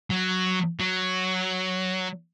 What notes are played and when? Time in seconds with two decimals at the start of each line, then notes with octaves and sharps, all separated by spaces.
0.10 F#3
0.80 F#3